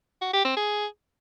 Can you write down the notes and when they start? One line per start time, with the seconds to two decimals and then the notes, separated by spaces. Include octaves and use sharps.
0.22 F#4
0.33 G4
0.45 C4
0.57 G#4